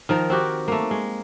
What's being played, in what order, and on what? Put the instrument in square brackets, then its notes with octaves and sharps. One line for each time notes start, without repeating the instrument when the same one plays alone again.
[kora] D#3 F3 A#4
C4 F#4 G4
A3 A#3
G#3